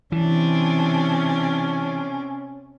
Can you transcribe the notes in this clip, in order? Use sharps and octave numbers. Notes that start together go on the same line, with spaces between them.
C3 E3 C#4 D4